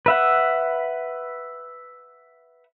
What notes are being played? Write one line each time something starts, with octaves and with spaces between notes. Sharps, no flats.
B4 E5 F#5